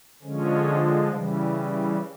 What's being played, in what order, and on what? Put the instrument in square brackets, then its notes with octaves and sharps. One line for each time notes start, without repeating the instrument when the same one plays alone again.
[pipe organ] D3 F3 G#3 C#4
C#3 E3 G3